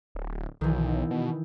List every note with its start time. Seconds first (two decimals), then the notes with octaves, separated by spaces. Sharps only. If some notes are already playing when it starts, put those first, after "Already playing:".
0.15 D1
0.61 B1 D#3 E3
1.11 B2